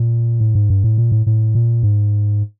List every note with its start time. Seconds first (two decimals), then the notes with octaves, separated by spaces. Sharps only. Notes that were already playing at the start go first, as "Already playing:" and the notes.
Already playing: A#2
0.40 A2
0.55 G#2
0.70 G2
0.84 A2
0.98 A#2
1.12 A2
1.26 A2
1.55 A#2
1.83 G#2